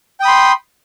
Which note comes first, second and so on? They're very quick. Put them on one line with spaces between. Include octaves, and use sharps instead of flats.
G5 D#6 B5 C6